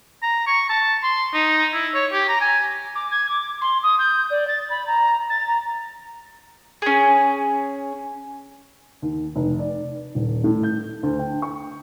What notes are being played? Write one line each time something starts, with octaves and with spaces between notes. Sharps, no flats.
A#5
C#6
A5
C6
D#4
E4
C#5
G4
A#5
G#5
D6
G#6
D6
C6
D#6
G6
D5
A6
B5
A#5
A6
A#5
C#4 G#4
D#2
F1
D5
D#1
A2
G6
D2
G5
C#6